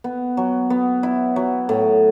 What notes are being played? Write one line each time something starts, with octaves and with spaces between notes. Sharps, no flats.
B3
F#3
B3
E4
F#3
A2